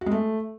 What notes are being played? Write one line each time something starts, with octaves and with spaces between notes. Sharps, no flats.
F#4
G#3
A3